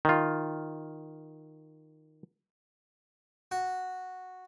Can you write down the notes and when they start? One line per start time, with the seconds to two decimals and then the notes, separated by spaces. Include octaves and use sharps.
0.05 D#3 F4
3.51 F#4